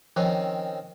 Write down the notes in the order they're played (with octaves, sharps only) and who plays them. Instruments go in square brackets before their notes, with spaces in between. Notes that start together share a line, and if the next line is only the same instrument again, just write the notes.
[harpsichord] D#3 C4 C#4 [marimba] F3